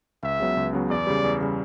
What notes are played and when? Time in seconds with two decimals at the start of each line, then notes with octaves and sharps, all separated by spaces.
0.23 C#2 E5
0.40 C#3 F#3 B3
0.57 C#2
0.73 C#3 F#3 B3
0.90 E2 D5
1.07 C#3 G3
1.24 E2
1.41 C#3 G3